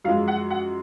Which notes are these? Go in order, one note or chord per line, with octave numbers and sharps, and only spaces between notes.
F#2 F3 G#3 F5
F#5
F#5